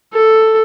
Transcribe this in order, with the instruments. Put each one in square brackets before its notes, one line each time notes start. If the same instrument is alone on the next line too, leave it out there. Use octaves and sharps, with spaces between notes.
[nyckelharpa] A4